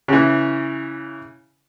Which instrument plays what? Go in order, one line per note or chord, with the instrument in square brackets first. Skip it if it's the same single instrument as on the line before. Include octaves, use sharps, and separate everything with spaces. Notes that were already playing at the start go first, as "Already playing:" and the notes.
[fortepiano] C#3 E3